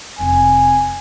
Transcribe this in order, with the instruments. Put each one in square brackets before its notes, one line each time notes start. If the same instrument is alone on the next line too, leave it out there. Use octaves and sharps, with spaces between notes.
[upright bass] F1 D4 [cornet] G#5